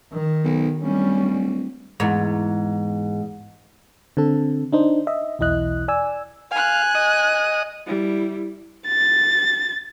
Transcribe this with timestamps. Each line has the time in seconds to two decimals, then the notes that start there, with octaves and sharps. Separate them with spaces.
0.12 D#3
0.44 B1
0.83 D1 G3 C#4
2.00 E2 G#2
4.17 D3 C4 A4
4.73 D4 D#4 C5
5.07 D#5 E5
5.39 B1 E2 E4 D#5 F#6
5.88 D5 G#5 E6
6.52 F5 G#5 F#6
6.95 D#5
7.86 G3 E4
8.87 A6